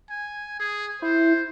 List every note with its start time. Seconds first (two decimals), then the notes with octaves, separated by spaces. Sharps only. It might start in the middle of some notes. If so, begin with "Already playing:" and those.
0.10 G#5
0.60 G#4
1.02 E4 C5